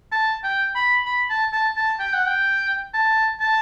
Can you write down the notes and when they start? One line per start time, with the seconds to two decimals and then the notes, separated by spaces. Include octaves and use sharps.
0.12 A5
0.44 G5
0.75 B5
1.06 B5
1.30 A5
1.53 A5
1.77 A5
2.00 G5
2.14 F#5
2.27 G5
2.94 A5
3.41 A5